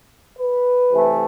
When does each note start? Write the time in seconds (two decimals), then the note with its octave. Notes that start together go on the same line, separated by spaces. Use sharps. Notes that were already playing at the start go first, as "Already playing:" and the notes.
0.38 B4
0.90 C3 E3 A3